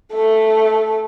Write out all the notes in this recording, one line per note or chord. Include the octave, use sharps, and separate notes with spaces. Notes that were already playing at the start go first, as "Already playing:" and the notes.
A3